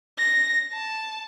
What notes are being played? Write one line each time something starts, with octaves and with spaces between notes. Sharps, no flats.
A#6
A5